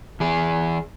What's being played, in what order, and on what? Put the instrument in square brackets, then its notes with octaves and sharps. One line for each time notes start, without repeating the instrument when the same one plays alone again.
[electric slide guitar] E3 G#4